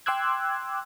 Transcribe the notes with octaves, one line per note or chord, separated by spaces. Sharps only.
G5 C6 D6 E6 F#6 G#6